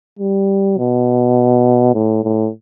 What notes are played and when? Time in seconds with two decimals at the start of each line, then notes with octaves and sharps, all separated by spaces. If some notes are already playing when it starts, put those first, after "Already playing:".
0.19 G3
0.78 B2
1.94 A2
2.23 A2